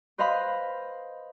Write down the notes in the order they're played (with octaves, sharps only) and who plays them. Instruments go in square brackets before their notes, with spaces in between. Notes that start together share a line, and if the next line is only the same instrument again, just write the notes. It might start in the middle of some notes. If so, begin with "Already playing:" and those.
[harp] B4 C5 D#5 F5 B5 C6